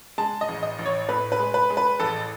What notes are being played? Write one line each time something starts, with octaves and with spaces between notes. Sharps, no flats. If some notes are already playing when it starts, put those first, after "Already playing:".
G#3 A5
D#5
A1
D#5
A1
C#5
A2 B4
B4
G#3
B4
G#3
B4
A1 A4